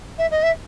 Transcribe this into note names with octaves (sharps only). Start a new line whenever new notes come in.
E5
D#5
E5